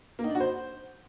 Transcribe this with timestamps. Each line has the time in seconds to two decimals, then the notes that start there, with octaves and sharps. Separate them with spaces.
0.19 A#3
0.24 D#4
0.30 D4
0.35 F#4
0.40 C5